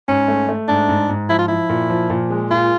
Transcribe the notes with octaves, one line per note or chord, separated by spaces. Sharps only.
G#2 C#4
A3
A3
G#2 D4
G#2
G#2
F3 E4
F4
F3 E4
A#2
F3
A#2
G#3
A#2 F4